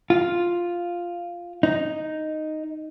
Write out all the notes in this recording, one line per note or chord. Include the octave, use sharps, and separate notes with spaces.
F4
D#4